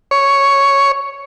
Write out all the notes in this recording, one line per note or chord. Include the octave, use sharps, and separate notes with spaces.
C#5